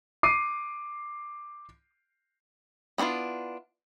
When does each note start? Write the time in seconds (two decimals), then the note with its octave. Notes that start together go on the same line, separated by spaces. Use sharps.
0.23 D6 C7 D#7
2.98 B3 C#4 D4 E4 F4